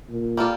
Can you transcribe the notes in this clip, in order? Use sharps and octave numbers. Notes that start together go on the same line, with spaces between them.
A#2
G3 A#3 F4 A4